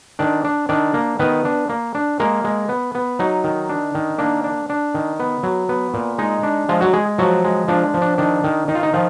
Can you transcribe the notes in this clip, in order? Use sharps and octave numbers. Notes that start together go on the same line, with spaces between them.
D#3 D4 D5
D4
D#3 D4 D5
A#3
D#3 B3 B4
D4
A#3
D4
G#3 A#3 A#4
G#3
B3
B3
F#3 D#4
D#3
D4
D#3
A#3 D4
D4
D4
D#3
B3
F#3
B3
A#2
G#3 D#4
D4
F3 G#3 F4
F#3 F#4
G#3 G#4
F3 F#3 F#4
G#3
F3 D4 F4
F3
D4
D#3 D4
D#3
D#3 D#4
F4
D#4
D#3 F3 F4